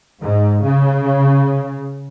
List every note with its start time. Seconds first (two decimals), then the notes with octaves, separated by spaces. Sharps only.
0.21 G#2
0.63 C#3